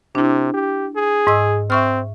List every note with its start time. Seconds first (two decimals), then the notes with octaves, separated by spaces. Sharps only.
0.15 C3 D4 E4
0.53 G4
0.96 G#4
1.27 G#2 D#5 E6
1.70 C4 E5 C#6 F6